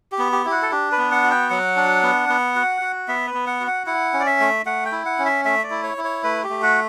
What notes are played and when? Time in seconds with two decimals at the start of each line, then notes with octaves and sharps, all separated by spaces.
0.12 G4
0.19 B3
0.32 G4
0.45 E4 G4
0.51 F#4
0.62 A4
0.71 D4 G4
0.92 B4
0.98 B3
1.11 F#5
1.24 F#4
1.31 G5
1.50 F#3 F#5
1.76 D4
2.03 B3
2.29 B3
2.56 F#4
2.82 F#4
3.08 B3 E5
3.27 B4
3.34 B3
3.47 F#5
3.60 F#4
3.67 F#5
3.86 E4 F#5
4.13 C#4
4.20 D5
4.27 E5
4.40 A3
4.66 A3 F#5
4.85 G5
4.92 E4
5.06 F#5
5.19 C#4
5.25 E5
5.45 A3 E5
5.64 D5
5.70 E4
5.83 C#5
5.97 E4
6.04 C#5
6.24 A3 B4
6.44 G4
6.49 A3
6.62 F#4